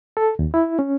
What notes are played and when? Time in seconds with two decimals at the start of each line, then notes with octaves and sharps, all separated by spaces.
0.17 A4
0.39 D#2
0.54 E4
0.79 C#4